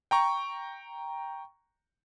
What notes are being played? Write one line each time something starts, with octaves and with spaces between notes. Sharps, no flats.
G5 A#5 C#6